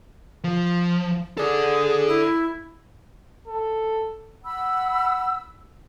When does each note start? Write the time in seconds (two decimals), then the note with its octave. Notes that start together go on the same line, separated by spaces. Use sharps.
0.44 F3
1.38 G#4 A4 D5
2.08 E4
3.47 A4
4.44 F#5 B5 E6